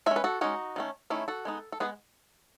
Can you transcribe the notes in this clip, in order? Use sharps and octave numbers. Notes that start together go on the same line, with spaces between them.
G#3 C#4 E5 G#5
B4
F#4 A4
G#3 C#4 D#4 F#4
D#3 A3 C#4
D#3 A3 C#4 E4
F#4 A4
G#3 B3 D#4
A4
G#3 B3 G#4 B4